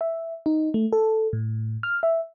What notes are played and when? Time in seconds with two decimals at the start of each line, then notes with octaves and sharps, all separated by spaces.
0.01 E5
0.46 D#4
0.74 A3
0.93 A4
1.33 A2
1.83 F6
2.03 E5